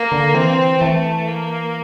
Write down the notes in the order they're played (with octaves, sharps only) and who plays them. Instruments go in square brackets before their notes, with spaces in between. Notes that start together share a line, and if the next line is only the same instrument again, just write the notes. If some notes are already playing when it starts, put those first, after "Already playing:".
Already playing: [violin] A#3
[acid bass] D3
[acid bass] E3 [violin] C4
[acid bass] E3 [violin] A3
[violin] A#3